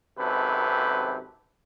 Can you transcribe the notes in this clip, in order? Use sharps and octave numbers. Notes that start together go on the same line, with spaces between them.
G#1 F#2 C3 A4 B4